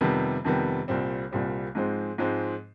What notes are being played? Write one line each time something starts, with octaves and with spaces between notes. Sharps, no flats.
F2 C3 D#3 G3 B3
F2 C3 D#3 G3 B3
C2 A#2 G3 C4
C2 A#2 G3 C4
G#2 F3 G#3 C4
G#2 F3 G#3 C4